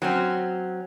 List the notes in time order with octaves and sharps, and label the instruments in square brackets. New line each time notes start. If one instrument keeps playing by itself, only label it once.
[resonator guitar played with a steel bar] F#3 C4 C#4